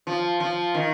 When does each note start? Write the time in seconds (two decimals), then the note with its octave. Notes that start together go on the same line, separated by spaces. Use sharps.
0.07 F3
0.40 F3
0.74 D#3